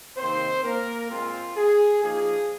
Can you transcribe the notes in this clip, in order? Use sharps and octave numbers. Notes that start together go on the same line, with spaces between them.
C3 D#3 A#3 C4 D#4 C5
A#3 A#4
A#2 G#3 C4 F4
G#4
A#2 F3 A#3 D#4 G#4